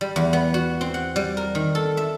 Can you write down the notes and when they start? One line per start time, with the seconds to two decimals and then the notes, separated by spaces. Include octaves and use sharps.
0.01 G3
0.16 E2
0.33 B3
0.54 F#4
0.81 C4
0.94 F#5
1.16 G3
1.37 A#4
1.55 D#3
1.75 A4
1.97 E5